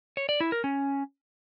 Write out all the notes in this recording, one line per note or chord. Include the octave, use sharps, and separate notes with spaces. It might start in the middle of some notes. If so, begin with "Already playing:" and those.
C#5
D5
E4
A#4
C#4